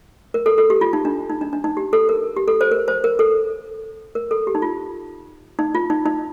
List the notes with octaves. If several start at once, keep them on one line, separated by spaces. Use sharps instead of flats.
A#4
A4
A4
G4
F4
D#4
D4
D#4
D4
D4
D#4
G4
A4
A#4
G4
A4
C5
A#4
C5
A#4
A4
A#4
A4
G4
D#4
F4
D#4
F4
D#4
D#4